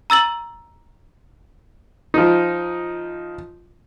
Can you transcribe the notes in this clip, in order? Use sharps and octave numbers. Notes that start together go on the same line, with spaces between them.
A#5 E6 A6 F#7
F3 D#4